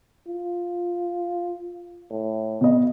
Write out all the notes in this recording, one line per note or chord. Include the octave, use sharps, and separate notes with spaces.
F4
A2
B2 D#5